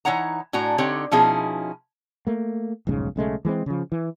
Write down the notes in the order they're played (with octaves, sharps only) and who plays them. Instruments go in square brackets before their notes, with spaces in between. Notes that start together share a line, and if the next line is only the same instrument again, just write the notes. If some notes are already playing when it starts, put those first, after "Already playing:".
[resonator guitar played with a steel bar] E3 D4 D#4 C#5 F#5 A#5
A2 D4 F#4 G#5 A#5
D3 C4 D#4 G4 C#5
B2 F3 C#4 D#4 E4 G#4
[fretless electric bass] A3 A#3
F1 B1 G#2 C#3
B1 C#3 G#3 A3
E3 G#3 A#3 C4
C#3 F3
E3